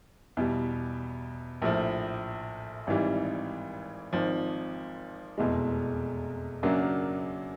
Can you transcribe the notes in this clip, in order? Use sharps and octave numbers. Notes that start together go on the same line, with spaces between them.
E2 B2 G3
A#1 A2 F3
G#1 G#2 E3 G3
G#1 G#2 F3
F1 E2 B2 G#3
F#2 C#3 F#3 A#3 D4